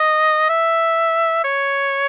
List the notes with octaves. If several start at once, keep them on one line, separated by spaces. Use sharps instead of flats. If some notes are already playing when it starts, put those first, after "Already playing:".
Already playing: D#5
E5
C#5